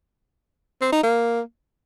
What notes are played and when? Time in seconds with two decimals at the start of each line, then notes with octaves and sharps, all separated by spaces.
0.81 C4
0.92 D#4
1.03 A#3